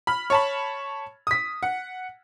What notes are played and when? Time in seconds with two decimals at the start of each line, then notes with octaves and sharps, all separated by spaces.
0.07 B5 F6
0.30 C#5 A5 B5
1.27 D#6 B6
1.63 F#5